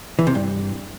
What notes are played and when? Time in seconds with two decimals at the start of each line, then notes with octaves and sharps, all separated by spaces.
0.19 E3
0.27 C3
0.35 G2